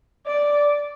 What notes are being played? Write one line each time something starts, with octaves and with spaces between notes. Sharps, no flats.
D5